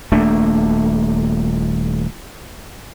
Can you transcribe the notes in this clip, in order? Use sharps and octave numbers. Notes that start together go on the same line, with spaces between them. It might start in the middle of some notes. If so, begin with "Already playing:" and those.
D#1 A3 A#3 D4